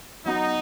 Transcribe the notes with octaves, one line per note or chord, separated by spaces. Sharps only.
F#3 B3 D#4 F#4